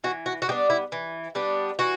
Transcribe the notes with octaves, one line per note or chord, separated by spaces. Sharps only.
E3 F#4
F#4
F#4
G3 B3 D4 G4
E4
E3
G3 B3 D4
E3 F#4